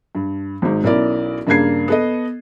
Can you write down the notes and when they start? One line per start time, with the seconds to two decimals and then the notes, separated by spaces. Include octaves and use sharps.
0.15 G2
0.62 G#1 G#2
0.84 B1 C#4 E4 A#4 D5
1.47 G2 C#3 A#3 D4 G#6 C7
1.88 B3 A4 D#5